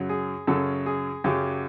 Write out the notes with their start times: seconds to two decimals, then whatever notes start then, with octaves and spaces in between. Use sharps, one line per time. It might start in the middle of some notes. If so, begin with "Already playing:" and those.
Already playing: F#2 C#3 F#3
0.09 G#4
0.47 F#2 C#3 F#3 A4
0.86 G#4
1.24 F#2 C#3 F#3 G4